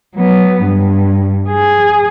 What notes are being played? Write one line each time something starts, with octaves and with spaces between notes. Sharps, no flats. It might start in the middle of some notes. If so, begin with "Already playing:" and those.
F#3 B3
G2
G#4